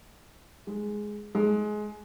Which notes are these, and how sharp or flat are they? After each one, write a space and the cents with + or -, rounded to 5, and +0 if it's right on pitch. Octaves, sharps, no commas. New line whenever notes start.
G#3 +5
G#3 +20